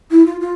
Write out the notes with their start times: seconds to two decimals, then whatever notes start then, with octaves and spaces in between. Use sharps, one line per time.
0.11 E4
0.26 F4
0.40 F4